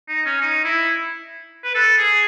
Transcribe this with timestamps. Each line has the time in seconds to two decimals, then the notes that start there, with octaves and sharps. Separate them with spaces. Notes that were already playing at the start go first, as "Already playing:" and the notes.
0.08 D#4
0.26 C#4
0.41 D#4
0.65 E4
1.64 B4
1.74 A4
1.98 G#4